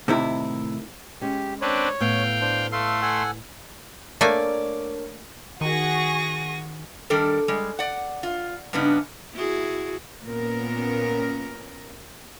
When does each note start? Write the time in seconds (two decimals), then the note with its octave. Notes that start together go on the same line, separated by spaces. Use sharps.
0.08 A2 C3 D#3 E4
1.21 G#3 C#4 G4
1.61 C4 D4 B4 C#5
2.00 A2 B3 F5 G5
2.41 D4 C5
2.72 A3 A4 F5 C6
3.02 A4 F#5 G#5
4.21 A3 A#3 D4 A#4 C#5 D5 G#5
5.61 D#3 F#4 G#4 C#6 A#6 D#7
7.10 D#3 G3 D4 A4 A#4
7.48 G3 G#3
7.79 D5 F#5
8.23 F4
8.73 G2 C#3 B3 D4 D#4
9.34 E4 F#4 G#4
10.23 A#2 B3 C#4 A#4